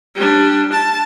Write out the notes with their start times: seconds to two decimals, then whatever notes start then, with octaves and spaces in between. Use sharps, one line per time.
0.16 G3 D4
0.72 A5